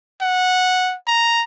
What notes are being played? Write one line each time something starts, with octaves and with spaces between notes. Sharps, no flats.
F#5
A#5